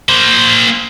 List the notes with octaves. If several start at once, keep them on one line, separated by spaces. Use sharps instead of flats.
A#3 C5